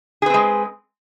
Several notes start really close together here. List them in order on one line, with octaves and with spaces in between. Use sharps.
G#4 B4 C4 G#3